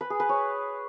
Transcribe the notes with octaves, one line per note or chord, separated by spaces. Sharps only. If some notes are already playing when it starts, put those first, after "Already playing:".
B4
G#4
B4
C#5